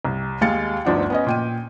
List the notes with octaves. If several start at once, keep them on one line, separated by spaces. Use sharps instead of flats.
C2
D#2 G#3 F5 A6 C#7
G1 D2 F3 D4 D#4 F#5
B3 C#4 D#5
A#2 G5 D#7